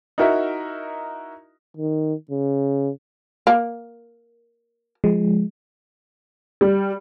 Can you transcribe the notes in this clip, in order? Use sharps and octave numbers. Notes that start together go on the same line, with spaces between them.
D#4 E4 F#4 A#4 E5
D#3
C#3
A#3
F3 G#3
G3